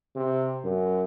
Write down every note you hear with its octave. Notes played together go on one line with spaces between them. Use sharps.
C3
F#2